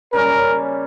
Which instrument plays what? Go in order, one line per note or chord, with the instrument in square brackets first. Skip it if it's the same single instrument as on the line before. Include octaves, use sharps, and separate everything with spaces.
[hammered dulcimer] C#3 G3 A#3 C#4 [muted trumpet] A#4